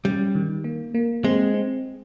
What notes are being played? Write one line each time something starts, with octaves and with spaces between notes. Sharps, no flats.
G3 C#4
D#3
A#3
A#3
G#3 C4
C4